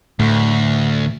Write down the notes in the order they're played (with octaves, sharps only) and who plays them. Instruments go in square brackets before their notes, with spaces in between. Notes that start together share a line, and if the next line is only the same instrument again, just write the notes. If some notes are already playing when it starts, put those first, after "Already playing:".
[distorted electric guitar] D2 [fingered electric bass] A2